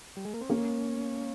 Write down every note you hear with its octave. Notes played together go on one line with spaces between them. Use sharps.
G3
G#3
A#3
C4
A#3 C#4